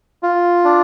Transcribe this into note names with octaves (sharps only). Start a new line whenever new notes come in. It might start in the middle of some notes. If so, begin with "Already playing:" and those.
F4
D4